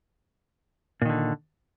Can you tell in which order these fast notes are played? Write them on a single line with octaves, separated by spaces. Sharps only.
A#2 D#3 D3